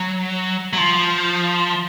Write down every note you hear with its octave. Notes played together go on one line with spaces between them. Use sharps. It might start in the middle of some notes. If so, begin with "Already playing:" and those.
Already playing: F#3
F#3
F3